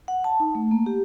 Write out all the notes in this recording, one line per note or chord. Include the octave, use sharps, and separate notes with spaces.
F#5
A5
D#4
A3
A#3
G4